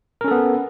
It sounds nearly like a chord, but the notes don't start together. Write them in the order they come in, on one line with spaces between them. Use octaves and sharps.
A#4 C#4 A4 B3